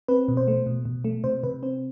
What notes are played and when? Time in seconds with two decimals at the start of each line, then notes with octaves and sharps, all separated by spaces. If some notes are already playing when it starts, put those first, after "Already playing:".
0.08 C4 B4
0.28 B2
0.37 C5
0.48 A3
0.66 B2
0.85 B2
1.05 A3
1.24 C3 C5
1.43 C3 B4
1.63 C4 C5